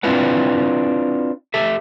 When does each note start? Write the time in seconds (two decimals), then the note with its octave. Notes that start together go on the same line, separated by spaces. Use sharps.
0.03 C4 D4 E4 F4 B4 F#5
1.54 G4 A4 E5